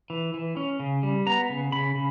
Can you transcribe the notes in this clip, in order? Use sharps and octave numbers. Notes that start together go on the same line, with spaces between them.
E3
E3
C#4
C#3
G3
B3 A#5
C#3
C#3 B5
C#3